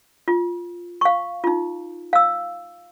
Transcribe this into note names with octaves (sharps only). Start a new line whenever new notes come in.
F4
F5 C#6
D#4 F4
F5 E6